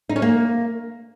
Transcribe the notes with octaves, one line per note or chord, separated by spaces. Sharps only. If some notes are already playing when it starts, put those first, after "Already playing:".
D#4
C#4
A#3